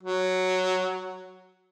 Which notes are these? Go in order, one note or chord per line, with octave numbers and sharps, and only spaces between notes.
F#3